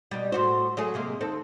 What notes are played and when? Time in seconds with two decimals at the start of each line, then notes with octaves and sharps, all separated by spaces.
0.11 B2 G3
0.32 A2 F#4 C5
0.77 F#3 A3 G#4
0.94 C3 G#3 A#3
1.21 D#2 C4 A4